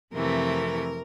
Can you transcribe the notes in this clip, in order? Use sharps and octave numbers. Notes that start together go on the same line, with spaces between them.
F2 C3 E3 A3 A#4